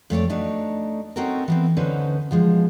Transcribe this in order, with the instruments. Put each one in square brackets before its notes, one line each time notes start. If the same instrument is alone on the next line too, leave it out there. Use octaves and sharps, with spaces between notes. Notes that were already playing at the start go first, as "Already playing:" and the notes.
[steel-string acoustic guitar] F2 A3 C#5 D5
A3 D4 D#4 F#4
C4 C#4 D#4 F#4 A4 A#4
E3 B3 C4
D2 D3 C#4 D#4 B4 C5
B2 F3 G#3